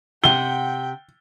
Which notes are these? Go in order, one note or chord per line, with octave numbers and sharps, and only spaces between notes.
C3 F#5 G5 G7